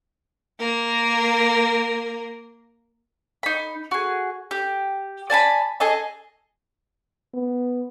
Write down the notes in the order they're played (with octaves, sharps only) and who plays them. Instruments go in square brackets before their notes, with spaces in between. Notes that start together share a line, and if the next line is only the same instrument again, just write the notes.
[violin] A#3 A#4
[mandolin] D#4 B5
F#4 G#4
G4
D5 G#5 A5 B5
G#4 A4 D#5 A5
[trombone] B3